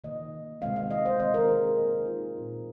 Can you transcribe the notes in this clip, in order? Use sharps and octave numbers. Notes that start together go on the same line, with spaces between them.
C3 D#3 A#3 D#5
C3 D#3 G#3 C4 F5
F5
D#5
C5
D#3 G#3 C4 D#5
A#4
G#4
C3 D#3 A#3
D#4
F4
A#2 F3 C4